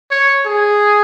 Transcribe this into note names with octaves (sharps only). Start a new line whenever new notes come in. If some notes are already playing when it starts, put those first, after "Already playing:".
C#5
G#4